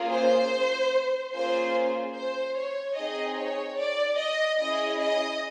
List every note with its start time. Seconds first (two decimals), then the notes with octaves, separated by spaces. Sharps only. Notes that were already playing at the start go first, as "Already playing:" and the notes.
Already playing: A#3 C#4 F4 G#4
0.12 C5
1.34 A#3 C#4 F4 G#4 C5
2.15 C5
2.57 C#5
2.97 C4 D#4 G#4 D#5
3.38 C#5
3.79 D5
4.19 D#5
4.59 C#4 E4 G#4 D#5
5.00 D#5